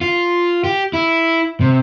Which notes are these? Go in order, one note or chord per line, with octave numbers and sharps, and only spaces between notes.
F4
G4
E4
C3